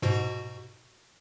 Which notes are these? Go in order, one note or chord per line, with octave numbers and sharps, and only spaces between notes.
G#2 B2 F#4